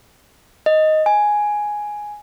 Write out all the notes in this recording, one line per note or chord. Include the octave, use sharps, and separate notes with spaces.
D#5
G#5